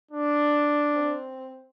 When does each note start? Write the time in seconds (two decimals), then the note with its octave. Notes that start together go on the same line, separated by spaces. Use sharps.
0.11 D4
0.94 C4